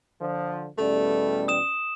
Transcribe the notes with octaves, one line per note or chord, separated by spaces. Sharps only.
D3 F3
E2 B2 G3 A3 C#4 D5
D#6 E7